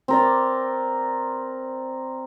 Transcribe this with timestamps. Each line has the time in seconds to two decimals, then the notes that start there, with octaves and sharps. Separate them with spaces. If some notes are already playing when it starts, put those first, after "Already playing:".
0.08 C4 A#4 D5